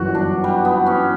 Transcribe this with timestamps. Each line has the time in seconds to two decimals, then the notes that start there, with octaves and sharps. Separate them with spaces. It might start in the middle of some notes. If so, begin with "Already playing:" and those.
Already playing: G1 F#2 E3 F#4
0.15 D4
0.44 G3
0.65 B3
0.86 C#4